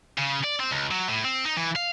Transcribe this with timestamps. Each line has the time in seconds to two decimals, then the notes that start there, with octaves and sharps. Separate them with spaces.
0.18 C#3
0.44 D5
0.60 C4
0.72 C#2
0.91 F#3
1.09 A2
1.25 C4
1.45 D#4
1.57 E3
1.76 F5